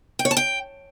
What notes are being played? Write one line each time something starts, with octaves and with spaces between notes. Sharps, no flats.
G5
C#5
A5
G5